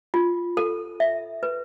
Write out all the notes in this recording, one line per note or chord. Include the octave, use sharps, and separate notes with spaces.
F4
A4
E5
B4